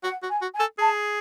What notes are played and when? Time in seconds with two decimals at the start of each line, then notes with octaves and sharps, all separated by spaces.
0.03 F#4 F#5
0.23 F#4
0.29 G#5
0.42 F#4
0.53 G#5
0.60 A4
0.78 G#4 A5